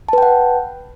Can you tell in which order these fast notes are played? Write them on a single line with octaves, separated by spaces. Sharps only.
A5 B4 G5 F#5